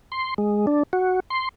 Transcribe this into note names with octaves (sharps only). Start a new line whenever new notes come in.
C6
G#3
D4
F#4
C6